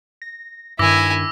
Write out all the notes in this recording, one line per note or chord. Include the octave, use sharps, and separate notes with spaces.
A#6
G2 D#3 E4 G#5 D6 E6 A#6